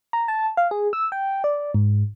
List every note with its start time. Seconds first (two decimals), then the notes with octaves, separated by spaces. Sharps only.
0.13 A#5
0.28 A5
0.57 F5
0.71 G#4
0.93 E6
1.12 G5
1.44 D5
1.75 G#2